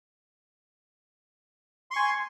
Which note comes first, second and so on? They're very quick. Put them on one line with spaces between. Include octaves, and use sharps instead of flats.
C6 C#6 G#5